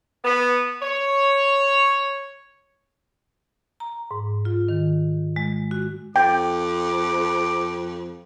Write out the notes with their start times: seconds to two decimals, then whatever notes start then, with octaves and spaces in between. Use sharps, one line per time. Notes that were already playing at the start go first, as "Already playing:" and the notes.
0.24 B3
0.82 C#5
3.80 A#5
4.11 G#2
4.45 F4
4.69 D#3
5.36 G#3
5.71 F#4
6.16 F2 G5 D6